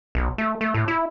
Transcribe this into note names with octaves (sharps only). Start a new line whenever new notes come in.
B1
A3
A3
A2
E4